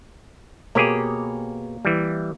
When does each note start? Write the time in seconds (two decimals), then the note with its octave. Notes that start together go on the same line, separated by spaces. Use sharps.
0.75 B2 A#3 G4 G#4 C#5
1.85 E3 G3